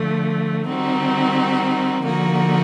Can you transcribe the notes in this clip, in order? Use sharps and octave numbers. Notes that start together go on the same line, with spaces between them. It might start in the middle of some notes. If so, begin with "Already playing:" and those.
Already playing: D3 F3 A3
D#3 G3 C4 D#4 F#4
D3 F3 A#3 D#4 F#4